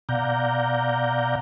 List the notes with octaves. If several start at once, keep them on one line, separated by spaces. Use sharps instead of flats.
B2 D5 F5 F#5 A#5 G6